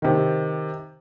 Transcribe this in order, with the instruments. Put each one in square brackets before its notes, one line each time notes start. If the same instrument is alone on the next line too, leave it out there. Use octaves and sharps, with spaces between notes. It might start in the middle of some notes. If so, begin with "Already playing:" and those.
[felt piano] C3 D#3